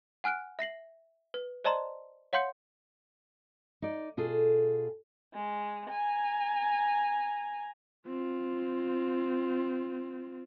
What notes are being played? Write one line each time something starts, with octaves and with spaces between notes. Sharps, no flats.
F#5 G#5 F6 F#6 D7
E5 A#6 C7 F#7
B4
C5 D5 D#5 A5 A#5 C6
C#5 F5 F#5 C6 G6 C#7
D#4 D5
B2 F4 G#4 A4
G#3
G#5 A#5
C4 F4